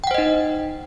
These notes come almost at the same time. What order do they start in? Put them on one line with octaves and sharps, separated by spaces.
G5 F#5 C5 D#5 D#4